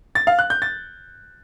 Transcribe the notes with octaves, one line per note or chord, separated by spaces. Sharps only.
A6
F5
F#6
G6
A6